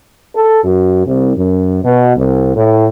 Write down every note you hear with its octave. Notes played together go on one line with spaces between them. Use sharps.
A4
F#2
C2
F#2
B2
C2
A2